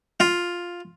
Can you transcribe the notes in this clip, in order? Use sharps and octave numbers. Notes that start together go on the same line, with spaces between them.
F4